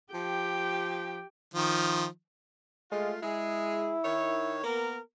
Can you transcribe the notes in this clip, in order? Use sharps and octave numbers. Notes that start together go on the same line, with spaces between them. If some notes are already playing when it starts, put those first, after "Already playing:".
F3 G4 G5
D#3 F3
G#3 A3 F4
G#3 E4 G#4
D#3 C#5
A#3 B3 A#4